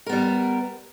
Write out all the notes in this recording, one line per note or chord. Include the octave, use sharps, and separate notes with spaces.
G3 B3 A#4